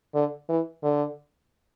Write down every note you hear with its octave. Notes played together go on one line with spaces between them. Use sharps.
D3
E3
D3